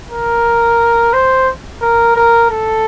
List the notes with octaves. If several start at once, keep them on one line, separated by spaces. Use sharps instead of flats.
A#4
C5
A#4
A#4
A4